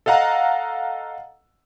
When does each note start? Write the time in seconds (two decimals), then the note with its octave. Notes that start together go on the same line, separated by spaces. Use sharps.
0.06 A4 D#5 F5 F#5 A#5